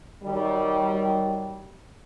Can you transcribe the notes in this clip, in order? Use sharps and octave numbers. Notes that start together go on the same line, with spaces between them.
D#3 F#3 G3